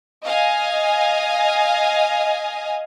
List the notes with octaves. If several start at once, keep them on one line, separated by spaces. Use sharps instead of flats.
D#5 F5 G#5